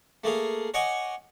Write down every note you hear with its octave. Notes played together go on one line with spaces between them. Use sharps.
A3 A#3 G#4 F5
C#5 D#5 F#5 G#5 C#6 D6